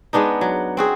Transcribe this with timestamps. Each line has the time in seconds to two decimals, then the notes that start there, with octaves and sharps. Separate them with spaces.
0.13 G#3 B3 D4 D#4
0.41 F#3
0.77 C4 F#4 G#4